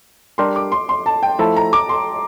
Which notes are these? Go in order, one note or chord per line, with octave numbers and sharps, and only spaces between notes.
G3 D4 G4 A#4 C6
D6
C6
C6
A5
G5
F3 A3 E4 A4 A5
A#5
D6
C6